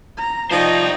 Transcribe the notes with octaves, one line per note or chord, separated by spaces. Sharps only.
A#5
F3 D#4 C5 D5 D#5 G5